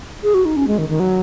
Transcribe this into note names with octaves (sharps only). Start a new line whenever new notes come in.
G#4
F#4
D#4
C#4
G#3
D#3
D#3
F#3